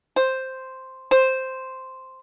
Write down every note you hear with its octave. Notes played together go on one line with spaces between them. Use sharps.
C5
C5